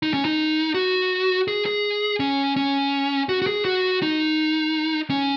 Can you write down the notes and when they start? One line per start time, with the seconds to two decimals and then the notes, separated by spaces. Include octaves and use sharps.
0.03 D#4
0.14 C#4
0.25 D#4
0.75 F#4
1.48 G#4
1.66 G#4
2.20 C#4
2.56 C#4
3.29 F#4
3.42 F#4
3.47 G#4
3.65 F#4
4.02 D#4
5.10 C#4